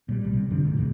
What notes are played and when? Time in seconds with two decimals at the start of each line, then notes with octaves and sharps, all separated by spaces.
0.09 A#2 G3
0.21 B1 G3
0.33 C3
0.50 F#2 D3 F3 D4
0.64 A#1 G#2
0.77 E2 G#2 B2